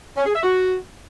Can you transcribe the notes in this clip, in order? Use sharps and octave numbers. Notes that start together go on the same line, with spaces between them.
C#4
G#4
E5
F#4